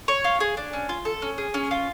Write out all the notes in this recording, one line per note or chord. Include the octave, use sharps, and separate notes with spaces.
C#5
F4
G#4
D4
C#4
F4
A4
C#4
G#4
C#4
F4